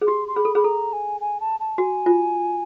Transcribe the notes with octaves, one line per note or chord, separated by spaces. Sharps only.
G#4
G4 C6
C6
G#4 B5
A4
G#4 B5
A4 A#5
G#5
G#5
A5
A5
F#4 G#5
F4